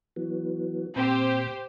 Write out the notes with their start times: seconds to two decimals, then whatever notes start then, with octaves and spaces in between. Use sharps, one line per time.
0.16 E3 F#3 B3
0.96 A#2 C4 G4 C5 G5